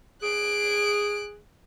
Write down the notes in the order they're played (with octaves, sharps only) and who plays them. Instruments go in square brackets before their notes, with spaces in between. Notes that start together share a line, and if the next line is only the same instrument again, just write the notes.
[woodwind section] G#4 [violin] F#6 D7